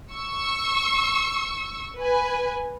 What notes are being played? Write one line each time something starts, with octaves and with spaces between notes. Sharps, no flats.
C#6 E6
B4 G#5